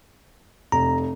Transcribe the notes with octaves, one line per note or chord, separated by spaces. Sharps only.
F1 A#5